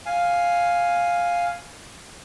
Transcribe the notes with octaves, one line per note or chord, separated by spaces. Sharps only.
F5 G#5